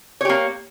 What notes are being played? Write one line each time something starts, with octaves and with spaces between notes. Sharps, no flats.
A#3 G4 C#5